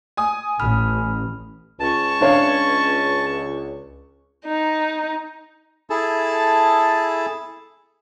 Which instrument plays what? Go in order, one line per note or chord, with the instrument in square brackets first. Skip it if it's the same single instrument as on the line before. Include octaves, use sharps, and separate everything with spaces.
[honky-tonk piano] G#5 D#6
[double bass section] A1 [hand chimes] B5 F6
[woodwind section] C#2 [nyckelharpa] C#4 C#6 [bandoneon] A5
[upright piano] D4 C#5 F5
[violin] D#4
[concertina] E4 G#4 A4 A5